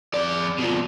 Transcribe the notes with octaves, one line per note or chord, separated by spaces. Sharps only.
F2 D5
B2 F3